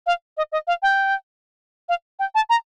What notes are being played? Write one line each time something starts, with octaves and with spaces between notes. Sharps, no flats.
F5
D#5
D#5
F5
G5
F5
G5
A5
A#5